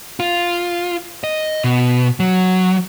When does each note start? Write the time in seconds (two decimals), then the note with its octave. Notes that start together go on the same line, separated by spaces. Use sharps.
0.20 F4
1.24 D#5
1.64 B2
2.20 F#3